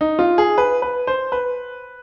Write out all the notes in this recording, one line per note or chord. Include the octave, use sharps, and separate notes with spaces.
D#4
F4
G#4
B4
B4
C5
B4